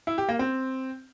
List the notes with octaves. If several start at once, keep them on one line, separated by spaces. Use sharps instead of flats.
E4
G4
A#3
C4